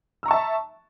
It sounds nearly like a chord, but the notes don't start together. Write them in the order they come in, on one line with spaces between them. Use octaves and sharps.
E6 A#5 C#6 A5 E5